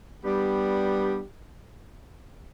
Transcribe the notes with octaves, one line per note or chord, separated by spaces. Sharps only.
G3 B3 D4 G4